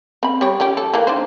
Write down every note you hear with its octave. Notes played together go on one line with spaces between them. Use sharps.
C4 B5
G3 G4 C#5
F3 C#4 G4
A4
E3 A#3
D4 D#4 C5